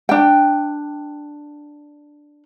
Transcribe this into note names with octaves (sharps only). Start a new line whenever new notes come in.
D4 G5